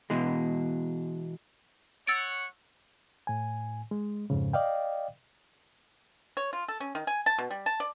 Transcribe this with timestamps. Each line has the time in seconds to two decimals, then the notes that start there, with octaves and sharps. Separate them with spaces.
0.10 B2 E3 G#3
2.07 C#5 F#5 E6 A6 D7
3.27 A2 G#5
3.91 G#3
4.30 F2 G#2 C#3
4.53 D5 D#5 F5 G5
6.37 C#5
6.53 F4
6.68 A4
6.80 C#4
6.95 D#3
7.07 G#5
7.26 A5
7.38 B2
7.51 G3
7.66 A5
7.80 D5